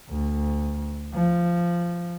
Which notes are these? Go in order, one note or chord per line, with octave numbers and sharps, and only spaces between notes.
D2
F3